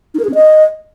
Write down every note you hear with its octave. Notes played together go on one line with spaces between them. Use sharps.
D#4
A#4
G#4
C#4
D#5